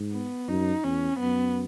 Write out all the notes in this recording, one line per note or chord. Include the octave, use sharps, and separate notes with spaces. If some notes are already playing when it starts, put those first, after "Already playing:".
Already playing: G#2
B3
F#2 D#4
E2 C#4
F#2 B3